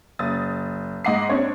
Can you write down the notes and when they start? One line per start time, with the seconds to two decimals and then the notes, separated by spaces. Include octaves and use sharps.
0.19 F#1 D#6 A6
1.05 G#2 D#5 F#5 D6 C7
1.29 C4 D4 C#5